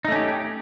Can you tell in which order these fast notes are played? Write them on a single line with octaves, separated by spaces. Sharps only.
D#4 A3 C#4 G4